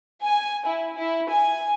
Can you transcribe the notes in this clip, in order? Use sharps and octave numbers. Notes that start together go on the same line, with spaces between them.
G#5
E4
E4
G#5